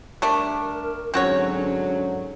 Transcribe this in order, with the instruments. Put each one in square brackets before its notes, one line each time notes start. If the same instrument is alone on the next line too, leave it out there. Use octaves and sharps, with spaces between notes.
[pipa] G3 A3 D4 [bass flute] A#4
[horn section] G#2 D3 F#3 [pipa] C4 F#4 C#5 [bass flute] C#4